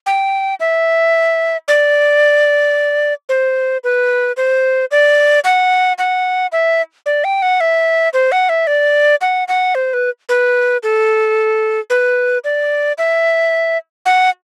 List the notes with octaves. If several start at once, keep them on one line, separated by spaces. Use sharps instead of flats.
G5
E5
D5
C5
B4
C5
D5
F#5
F#5
E5
D5
G5
F#5
E5
C5
F#5
E5
D5
F#5
F#5
C5
B4
B4
A4
B4
D5
E5
F#5